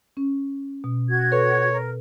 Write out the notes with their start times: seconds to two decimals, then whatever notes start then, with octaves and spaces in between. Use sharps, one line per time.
0.17 C#4
0.84 B2
1.09 F#4 G#6
1.31 A4 B4 C#5
1.71 A#4